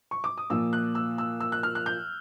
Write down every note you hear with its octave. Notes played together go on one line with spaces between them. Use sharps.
C#6
D6
D#6
A#2 F3 A#3 E6
F#6
E6
E6
E6
F#6
F6
F#6
G6